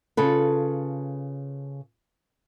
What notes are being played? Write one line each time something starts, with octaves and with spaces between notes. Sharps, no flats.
C#3 F4 A4 B4